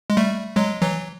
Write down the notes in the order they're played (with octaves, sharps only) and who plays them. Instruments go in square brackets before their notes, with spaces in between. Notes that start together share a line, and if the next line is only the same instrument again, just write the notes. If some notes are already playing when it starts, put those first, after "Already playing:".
[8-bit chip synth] G#3
G3 A3
F#3 G#3
E3 F#3